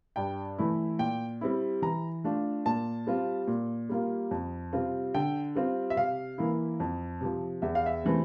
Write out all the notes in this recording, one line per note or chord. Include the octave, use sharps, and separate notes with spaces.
G2 G5
E3 A3 E4
A#2 G5
G3 C4 E4
E3 A#5
A3 D4 F4
A#2 A5
G3 C4 F4
A#2
G3 A#3 F4
F2
C3 G3 C4 F4
D3 G5
G3 C4 F4
E5
C3 F5
E3 A#3 E4
F2
C3 F3
E2 E5
F5
E5
C3 E3 A3 C4